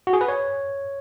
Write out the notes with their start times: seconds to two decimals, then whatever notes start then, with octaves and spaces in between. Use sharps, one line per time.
0.07 F#4
0.13 G#4
0.21 B4
0.28 C#5